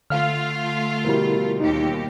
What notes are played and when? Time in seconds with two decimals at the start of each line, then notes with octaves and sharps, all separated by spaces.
0.10 D3 A3 F4 F5 F6
1.05 B2 F3 G3 E4 A#4
1.60 D#2 D#4 G4